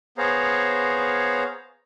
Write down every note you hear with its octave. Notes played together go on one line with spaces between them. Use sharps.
B3 G#4 C5 C#5 F5 A#5